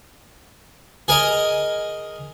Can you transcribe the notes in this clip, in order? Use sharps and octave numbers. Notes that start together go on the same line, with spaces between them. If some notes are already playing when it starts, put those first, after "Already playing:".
G#4 A#4 D#5